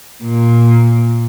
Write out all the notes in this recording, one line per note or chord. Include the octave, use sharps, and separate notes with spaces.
A#2